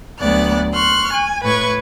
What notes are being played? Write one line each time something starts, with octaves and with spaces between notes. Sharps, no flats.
D2 F#3 B3 D5 F#6
C6 C#6 F6 F#6
G#5
A2 B4 C#6 G#6